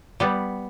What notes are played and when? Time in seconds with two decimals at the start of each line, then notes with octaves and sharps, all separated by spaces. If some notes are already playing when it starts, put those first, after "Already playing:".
0.20 G3 B3